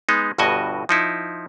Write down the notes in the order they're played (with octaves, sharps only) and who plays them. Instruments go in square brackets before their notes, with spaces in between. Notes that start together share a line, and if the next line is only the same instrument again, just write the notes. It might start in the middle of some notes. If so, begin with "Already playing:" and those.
[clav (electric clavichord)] G#3 B3 D#4
G1 G2 B2 F#4 D#5 G#5
F3 D#4 E4